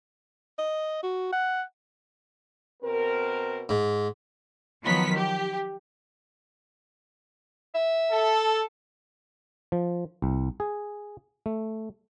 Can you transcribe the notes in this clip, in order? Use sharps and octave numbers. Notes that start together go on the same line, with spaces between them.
D#5
F#4
F#5
B2 C4 A#4
G#2
D#3 F3 F#3 B3 B6
G4
E5
A4
F3
C2
G#4
A3